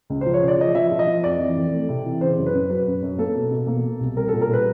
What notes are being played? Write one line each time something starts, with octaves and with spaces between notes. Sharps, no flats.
C#2
C5
F3
C#5
C#3
D5
F3 D#5
F3 E5
F3
D#5
F3
F2 D5
E3
F2
A3
C3
E3
C#3 C5
F#2
B4
F#2
F#3 B4
F#2
F#2
A#3 A4
B2
B2
A#3
B2
C2
G3 A#4
A4
A#2
A#4
G3 B4